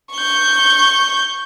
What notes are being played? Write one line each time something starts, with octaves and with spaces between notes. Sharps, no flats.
C#6 G6